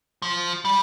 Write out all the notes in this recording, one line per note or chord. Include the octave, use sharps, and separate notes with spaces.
F3
G3